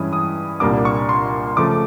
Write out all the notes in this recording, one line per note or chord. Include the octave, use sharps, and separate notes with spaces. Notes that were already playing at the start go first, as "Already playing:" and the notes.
Already playing: G2 E3 G#3 C#4 E4 D#6
D#6
C2 A#2 G3 A#3 D4 D6
C#6
C6
C#3 F3 A3 D6